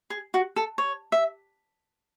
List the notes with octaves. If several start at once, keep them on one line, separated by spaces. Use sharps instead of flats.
G#4
F#4
A4
C#5
E5